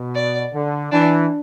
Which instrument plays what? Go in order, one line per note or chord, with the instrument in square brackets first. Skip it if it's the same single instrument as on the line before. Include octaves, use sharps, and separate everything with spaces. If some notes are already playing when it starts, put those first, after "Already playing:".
Already playing: [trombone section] B2
[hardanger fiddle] D5
[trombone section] D3
[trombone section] E3 [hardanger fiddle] D4